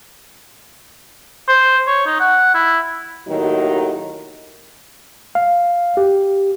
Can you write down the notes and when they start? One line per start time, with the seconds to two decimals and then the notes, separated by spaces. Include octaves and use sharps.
1.48 C5
1.87 C#5
2.06 D#4
2.20 F#5
2.54 E4
3.28 D#2 A2 D#3 F#3 D#4 A#4
5.35 F5
5.97 G4